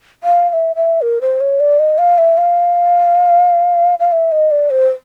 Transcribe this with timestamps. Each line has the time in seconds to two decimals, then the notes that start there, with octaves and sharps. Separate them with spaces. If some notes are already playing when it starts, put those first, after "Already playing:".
0.24 F5
0.49 F5
0.53 E5
0.76 E5
1.02 A#4
1.21 C5
1.40 C#5
1.60 D5
1.79 D#5
1.98 F5
2.18 E5
2.37 F5
4.00 F5
4.12 E5
4.32 D#5
4.51 D5
4.70 C5